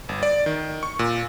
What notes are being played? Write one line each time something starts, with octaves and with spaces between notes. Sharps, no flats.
G1
D5
D#3
C#6
A#2